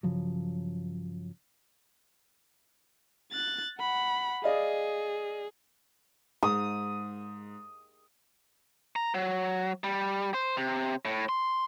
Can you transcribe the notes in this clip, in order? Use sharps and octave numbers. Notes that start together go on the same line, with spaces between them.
G2 C#3 F3 F#3
F#6 A6
F#5 B5
G#4 D5 D#5 F5
G#2 D#6
A#5
F#3
G3
C5
C3
A2
C6